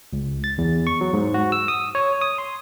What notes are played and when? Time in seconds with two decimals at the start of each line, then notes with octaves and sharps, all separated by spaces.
0.13 C#2
0.44 A6
0.58 E2
0.87 C#6
1.01 F#3
1.13 G#2
1.34 F#4
1.52 E6
1.68 D#6
1.95 C#5
2.21 D#6
2.38 C6